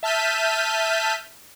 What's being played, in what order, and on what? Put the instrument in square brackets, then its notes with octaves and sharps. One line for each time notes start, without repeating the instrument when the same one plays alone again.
[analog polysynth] E5 A5 F6 G6 B6 D#7